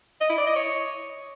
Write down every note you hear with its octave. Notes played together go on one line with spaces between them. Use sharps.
D#5
E4
D5
D#5
C#5